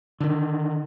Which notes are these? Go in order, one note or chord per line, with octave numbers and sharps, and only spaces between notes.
D3 D#3